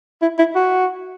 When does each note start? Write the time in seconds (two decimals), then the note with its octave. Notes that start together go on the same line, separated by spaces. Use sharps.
0.22 E4
0.39 E4
0.55 F#4